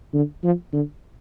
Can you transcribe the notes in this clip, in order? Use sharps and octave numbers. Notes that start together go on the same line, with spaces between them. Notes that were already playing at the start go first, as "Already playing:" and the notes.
D3
F3
D3